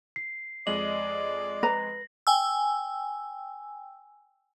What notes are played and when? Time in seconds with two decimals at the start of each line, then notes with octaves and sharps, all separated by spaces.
0.16 C7
0.67 F2 G#3 D5 D#5 F#7
1.63 B4 A#5 A#6
2.27 G5 G#5 E6